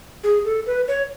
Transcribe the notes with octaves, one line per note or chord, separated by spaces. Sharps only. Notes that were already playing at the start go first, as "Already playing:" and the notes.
G#4
A4
B4
C#5